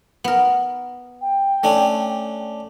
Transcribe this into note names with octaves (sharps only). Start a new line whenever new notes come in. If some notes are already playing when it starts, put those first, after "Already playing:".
B3 A#4
G5
A3 C#4 D4